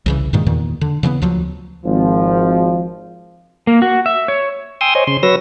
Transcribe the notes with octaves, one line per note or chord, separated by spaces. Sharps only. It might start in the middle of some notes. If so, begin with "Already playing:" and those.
C2 C#3 E3
G2 A#2 D#3 G#3
E2 A#2 D#3
D3
C#3 E3 G#3 B3
D2 F3 F#3
G#1 F3
A#3
F#4
E5
C#5
G5 G#5 C6 D#6 E6
C5 C#5 D#5 G#5
C#3 C6
F#3 B4 C#5 E6 A#6